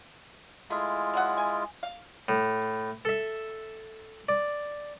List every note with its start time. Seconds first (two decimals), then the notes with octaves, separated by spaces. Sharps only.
0.70 G#3 A3 E4 F4 G#4
1.14 F#3 A#3 F#5
1.38 G#5
1.83 F5
2.28 A2
3.05 A4 E5
4.29 D5